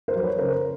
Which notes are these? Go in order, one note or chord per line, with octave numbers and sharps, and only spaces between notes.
A#4 C5
F#3
B4 C#5
C#3 A#4 C5